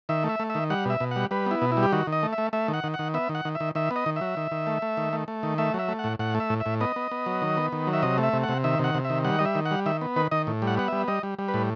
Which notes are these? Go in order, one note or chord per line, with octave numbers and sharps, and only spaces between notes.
D#3 E5
A3
E5
A3
E5
D#3
G3 F#5
B2 E5
B2
G3 F#5
G3 B4
B3 E4
B2
E4
G3
G4
D#3 F#4
D#3
D#5
A3
E5
A3
A3 E5
D#3
F#5
D#3
F#5
D#3
B3 E5
D#3
F#5
D#3
E5
D#3
D#3 E5
B3
D#5
D#3
F#3 E5
D#3
D#3
A3
A3
D#3
A3
A3
D#3
A3 E5
F#3 E5
A3
A2 F#5
A2 F#5
A3
E5
A2
E5
A2
B3 D#5
B3
B3
F#3
D#3
B3
D#3
F#3
E5
C3 D#5
A3
E5
C3
F#5
C3
D#3 E5
C3 F#5
C3
E5
D#3
G3 F#5
G3 D#5
E5
D#3
F#5
G3
D#3 E5
B3
D#3 B4
D#3 D#5
A2
G3
F#5
B3 F#5
G3 E5
G3 D#5
G3
G3
B4
A2